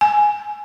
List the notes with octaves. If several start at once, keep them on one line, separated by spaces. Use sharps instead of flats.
G#5